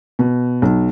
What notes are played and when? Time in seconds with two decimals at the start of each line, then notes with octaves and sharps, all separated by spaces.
0.19 B2
0.62 B1